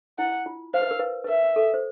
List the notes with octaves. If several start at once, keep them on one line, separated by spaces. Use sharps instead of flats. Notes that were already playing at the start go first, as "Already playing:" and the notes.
E4 F#5
F4
C5 F5
B4
A#4
B4
B4
A#4 E5
A4
C5